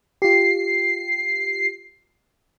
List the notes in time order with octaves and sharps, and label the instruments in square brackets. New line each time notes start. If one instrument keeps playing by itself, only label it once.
[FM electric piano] F4 G4 [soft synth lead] C7